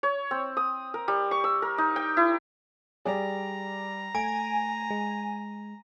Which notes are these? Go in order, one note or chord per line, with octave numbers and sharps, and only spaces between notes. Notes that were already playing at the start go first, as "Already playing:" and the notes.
C#5
C4
D#6
A#4
G3
C#6
E6
A#4
D#4
G5
E4
G3 G#4 D5 A#5
A3 G#5 D7
G#3